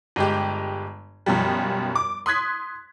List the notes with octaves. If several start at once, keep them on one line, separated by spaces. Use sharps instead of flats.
G1 G#3 G4
F#2 B2 F3 G3
D6
C6 D#6 F#6 G#6 B6